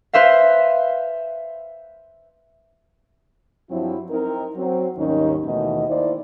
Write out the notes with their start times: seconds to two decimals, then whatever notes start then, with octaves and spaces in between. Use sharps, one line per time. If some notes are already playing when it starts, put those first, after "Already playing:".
0.13 B4 C5 E5 F5
3.70 G2 F3 F#3 C4 E4
4.11 C4 D#4 A#4
4.56 F#3 C4
4.97 D#2 G#2 D#3 G3 C#4 D#4
5.46 D#2 B2 D#3 E3 A3 D#5
5.87 D#3 A#3 D#4 E4 C5 D5